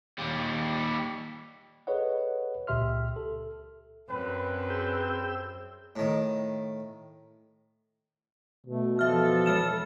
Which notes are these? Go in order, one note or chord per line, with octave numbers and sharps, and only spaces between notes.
D#2 G3
G#4 A4 B4 C#5 D#5 F#5
C#2 A#2 G4 E5 C6 F6
A4
F#2 C4 B4
G#4 E6 G6
A2 D#3
B2 A3
E3 F3 A4 E5 F6
G#3 F6 E7